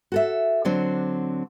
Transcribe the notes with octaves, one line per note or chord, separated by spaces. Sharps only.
F#4 A4 E5
D3 F#3 C4 D4